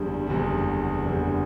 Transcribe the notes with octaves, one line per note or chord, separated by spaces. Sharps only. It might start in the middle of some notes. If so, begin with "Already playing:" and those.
Already playing: F#1 E2 D3 G3
F#1 E2 D3 G3
F#1 E2 D3 G3